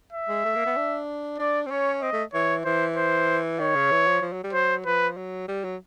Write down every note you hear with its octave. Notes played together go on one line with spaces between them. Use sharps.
E5
G#3
A3
A#3
B3
D4
D4 D5
C4
C#4 C#5
C4 D#5
A3
E3 C#5
E3 C5
C5
D#3 C#5
C#3
E3
F3
F3
F#3
G3
F#3 C5
F3 B4
F#3
G3
F#3